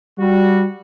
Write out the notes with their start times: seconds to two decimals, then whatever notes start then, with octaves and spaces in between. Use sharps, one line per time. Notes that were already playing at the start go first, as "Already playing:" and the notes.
0.18 G3 F#4